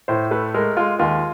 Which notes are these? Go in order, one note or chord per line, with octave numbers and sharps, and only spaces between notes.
A2 C5
A3 B4
G#3 A#4
G#3 F4
D#2 F4